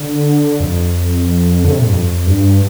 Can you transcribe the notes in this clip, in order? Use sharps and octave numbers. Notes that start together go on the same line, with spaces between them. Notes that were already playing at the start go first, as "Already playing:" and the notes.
Already playing: D3
F2
D3
C3
A#2
G2
F2
G2